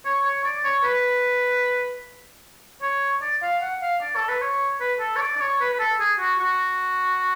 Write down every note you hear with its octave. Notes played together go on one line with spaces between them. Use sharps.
C#5
C#5
D5
C#5
B4
C#5
D5
F5
F#5
F5
D5
A4
B4
C#5
B4
A4
C#5
D5
D5
C#5
B4
B4
A4
G#4
F#4
F#4